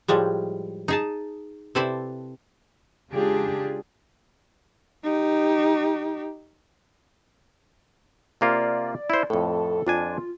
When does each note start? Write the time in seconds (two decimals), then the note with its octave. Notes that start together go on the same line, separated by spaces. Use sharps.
0.08 A2 F3 G3 G#3
0.88 D#4 G#4 A5
1.75 C3 E4 A4 B4 C5 D5
3.11 C#3 G#3 D4 F4 G4 G#4
5.03 D#4 G4
8.41 C3 A#3 F4 D5
9.10 E4 C5
9.30 F2 A2 A4
9.87 F2 D4 F4 G#5